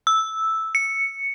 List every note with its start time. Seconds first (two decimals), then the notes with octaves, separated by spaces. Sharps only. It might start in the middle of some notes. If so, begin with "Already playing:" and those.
0.07 E6
0.75 C#7